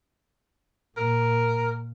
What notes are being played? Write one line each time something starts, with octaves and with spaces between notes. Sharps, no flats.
A#2 A#4